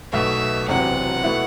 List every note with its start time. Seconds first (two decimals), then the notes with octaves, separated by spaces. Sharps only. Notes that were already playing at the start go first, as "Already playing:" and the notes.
0.12 B1 B2 A3 E5
0.68 E1 E2 C3 F#3 C4 F#5
1.24 B2 A3 E4 B4